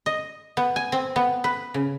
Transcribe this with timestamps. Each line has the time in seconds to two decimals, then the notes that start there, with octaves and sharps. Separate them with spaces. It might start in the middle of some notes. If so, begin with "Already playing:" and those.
0.06 D#5
0.57 B3
0.76 G#5
0.92 C4
1.16 B3
1.44 B4
1.74 C#3